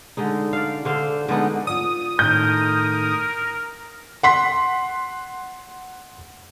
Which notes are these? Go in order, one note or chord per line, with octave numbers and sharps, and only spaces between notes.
D3 G#3 D#4
D5 F5
D3 C5 F5
D3 G#3 B3 D#4
F4 D5 D#6
A2 D#3 A#4 G6
F#5 C6 B6